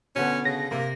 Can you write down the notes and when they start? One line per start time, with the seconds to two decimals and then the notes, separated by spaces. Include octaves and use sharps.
0.16 B2 D3 B3 C#4
0.45 C#3 A#6
0.71 C3 A#3